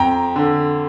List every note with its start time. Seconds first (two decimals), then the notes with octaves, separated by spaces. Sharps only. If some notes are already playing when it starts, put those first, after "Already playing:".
Already playing: F2 G5 A#5
0.36 D3